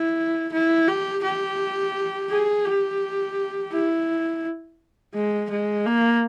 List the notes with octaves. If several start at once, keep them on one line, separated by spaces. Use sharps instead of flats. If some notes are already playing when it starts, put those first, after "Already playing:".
Already playing: E4
E4
G4
G4
G#4
G4
E4
G#3
G#3
A#3